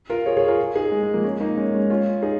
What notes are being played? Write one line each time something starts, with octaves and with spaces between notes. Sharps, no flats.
F4 A#4
G#4 C#5
G#4 C#5
F4 A#4
D#4 G#4
G#3
G#3
F3 A#3
G#3 C#4
A#3 D#4
G#3 C#4
G#3 C#4
C#4 F4
D#4 G#4